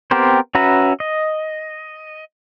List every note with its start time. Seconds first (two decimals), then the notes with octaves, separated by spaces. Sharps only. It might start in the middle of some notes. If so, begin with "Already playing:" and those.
0.11 B3 C4 G4 A#4 C5
0.55 C#4 F#4 B4 E5 A#5
1.00 D#5